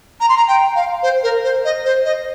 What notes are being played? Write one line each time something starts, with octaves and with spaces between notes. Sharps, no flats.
A#5
C6
A#5
G5
F5
C5
A#4
C5
D#5
C5
D#5